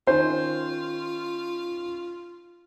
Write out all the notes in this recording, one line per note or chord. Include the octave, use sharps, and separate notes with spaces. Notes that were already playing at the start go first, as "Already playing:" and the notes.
D#3 C#4 F4 C5